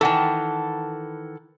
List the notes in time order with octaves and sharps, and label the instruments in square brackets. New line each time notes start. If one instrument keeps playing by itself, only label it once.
[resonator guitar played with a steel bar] D#3 E3 [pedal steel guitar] A4 F#5 A5